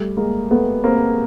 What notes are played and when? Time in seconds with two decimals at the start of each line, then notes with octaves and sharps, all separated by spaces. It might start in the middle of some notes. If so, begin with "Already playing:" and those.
Already playing: G3 A3
0.17 G#3 A#3
0.51 A3 B3
0.84 A#3 C4